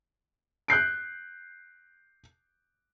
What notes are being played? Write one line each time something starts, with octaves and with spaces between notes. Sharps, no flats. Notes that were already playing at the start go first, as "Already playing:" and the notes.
F#6 G6 C7 D7